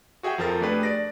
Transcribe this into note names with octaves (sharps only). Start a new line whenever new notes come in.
F#4 G#4 E5 G5
F2 F3 A4 A#4 A6
A3 D4 G4 G#4 B4
D5 A#6